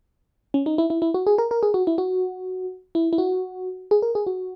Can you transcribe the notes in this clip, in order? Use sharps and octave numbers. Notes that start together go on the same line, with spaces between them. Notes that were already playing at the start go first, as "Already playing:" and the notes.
C#4
D#4
E4
E4
E4
F#4
G#4
A#4
A#4
G#4
F#4
E4
F#4
E4
E4
F#4
G#4
A#4
G#4
F#4